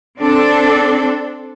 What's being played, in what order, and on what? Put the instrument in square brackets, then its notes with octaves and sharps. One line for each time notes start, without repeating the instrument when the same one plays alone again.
[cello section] C4 D4 A4